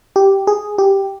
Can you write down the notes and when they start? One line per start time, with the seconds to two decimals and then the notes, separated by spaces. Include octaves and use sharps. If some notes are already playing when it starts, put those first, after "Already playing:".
0.16 G4
0.47 G#4
0.78 G4